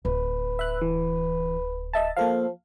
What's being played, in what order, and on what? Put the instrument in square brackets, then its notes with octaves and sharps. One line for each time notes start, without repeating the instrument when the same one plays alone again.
[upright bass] D1 [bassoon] B4
[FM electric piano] E5 F#6
E3
D#5 E5 A5
[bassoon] F3 [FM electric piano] A#3 A4 F5